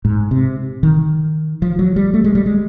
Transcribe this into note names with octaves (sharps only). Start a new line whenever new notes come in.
G#2
C3
D#3
F3
F#3
G3
A3
G#3
G3
G#3